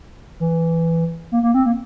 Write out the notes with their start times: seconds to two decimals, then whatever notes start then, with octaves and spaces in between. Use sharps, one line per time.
0.40 E3
1.32 A#3
1.43 A#3
1.54 C4
1.66 A#3